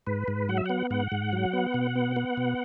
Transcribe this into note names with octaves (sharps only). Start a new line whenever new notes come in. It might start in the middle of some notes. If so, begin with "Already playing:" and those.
G#2 B4
G#2
F#3 F#5
E5
B3 F#5
G#2 F#5
G#2
F#3
B3
B2
B3
B3
B2